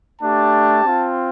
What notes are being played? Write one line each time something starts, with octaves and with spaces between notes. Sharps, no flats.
A3 D4 G4 A5
C4 F4